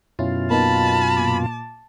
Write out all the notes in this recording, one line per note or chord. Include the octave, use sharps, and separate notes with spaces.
F#2 B2 C#4 E4 F4
A#3 B3 D#4 A5 B5
A#2 D6